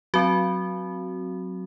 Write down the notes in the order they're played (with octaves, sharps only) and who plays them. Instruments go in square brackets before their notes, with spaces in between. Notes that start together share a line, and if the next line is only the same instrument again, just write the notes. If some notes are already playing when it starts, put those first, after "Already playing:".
[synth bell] F#3 C4 F#4